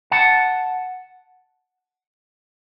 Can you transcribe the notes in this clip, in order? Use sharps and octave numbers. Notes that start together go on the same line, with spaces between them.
F#5 A5